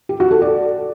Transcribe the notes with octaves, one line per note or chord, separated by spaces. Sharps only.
G4
F#4
A4
D5